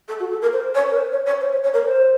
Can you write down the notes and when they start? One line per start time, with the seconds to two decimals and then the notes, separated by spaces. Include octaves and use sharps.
0.08 A4
0.20 F#4
0.31 A4
0.42 A#4
0.53 C5
0.75 C#5
0.91 A#4
0.97 C5
1.12 C#5
1.26 C#5
1.41 C5
1.52 C#5
1.63 C#5
1.74 A#4
1.85 C5